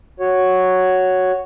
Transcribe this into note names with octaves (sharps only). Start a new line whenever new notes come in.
F#4 C#5